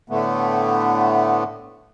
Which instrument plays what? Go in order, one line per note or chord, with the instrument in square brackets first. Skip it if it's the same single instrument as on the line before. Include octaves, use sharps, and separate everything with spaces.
[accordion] A2 D3 A3 B3